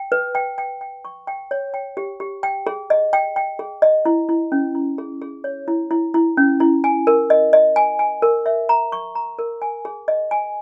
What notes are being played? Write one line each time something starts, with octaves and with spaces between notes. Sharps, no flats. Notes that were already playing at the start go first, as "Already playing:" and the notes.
Already playing: G5
B4
G5
G5
G5
C#6
G5
C#5
G5
G4
G4
G5
G#4
D#5
G5
G5
G#4
D#5
E4
E4
C#4
E4
G#4
G#4
C#5
E4
E4
E4
C#4
E4
G#5
A#4
D#5
D#5
G#5
G#5
A#4
E5
A#5
C#6
A#5
A#4
G#5
G#4
D#5
G#5